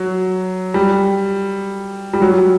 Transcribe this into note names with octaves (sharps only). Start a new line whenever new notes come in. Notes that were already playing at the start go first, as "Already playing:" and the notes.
Already playing: F#3
G3
G3
F#3